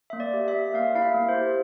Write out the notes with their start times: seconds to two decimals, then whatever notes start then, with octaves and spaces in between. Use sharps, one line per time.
0.10 A#3 E5
0.20 D5
0.34 G4
0.48 E5
0.54 A#3
0.74 A#3 F5
0.95 E4 F5
1.02 E5
1.14 A#3
1.28 C5
1.35 G4